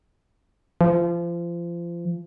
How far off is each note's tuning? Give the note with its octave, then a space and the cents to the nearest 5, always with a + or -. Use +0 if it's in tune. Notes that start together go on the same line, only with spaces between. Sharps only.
F3 -30